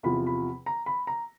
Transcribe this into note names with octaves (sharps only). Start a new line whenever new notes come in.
E2 C3 F3 B5
B5
A#5
B5
A#5